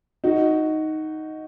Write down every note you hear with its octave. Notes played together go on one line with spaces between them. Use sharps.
D#4 F#4